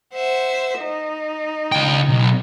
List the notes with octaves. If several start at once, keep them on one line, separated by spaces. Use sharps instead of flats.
C5 E5 F#5
D#4
C#2 G5
B1